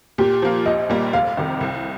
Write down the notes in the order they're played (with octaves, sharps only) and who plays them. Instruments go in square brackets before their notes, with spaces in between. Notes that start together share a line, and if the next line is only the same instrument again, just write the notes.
[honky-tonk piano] A#2 [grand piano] G4
[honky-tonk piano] F3 A#3 F4
[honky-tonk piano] A#1 [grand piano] D#5
[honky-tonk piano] A#2 G3 A#3
[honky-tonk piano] F1 [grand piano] F5
[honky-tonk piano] F2 C3 D#3
C2